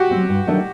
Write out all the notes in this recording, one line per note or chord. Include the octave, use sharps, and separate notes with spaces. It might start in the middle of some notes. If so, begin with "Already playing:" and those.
Already playing: F#4 G4
F#3 C4
G2
D#3 F#3 A3 D4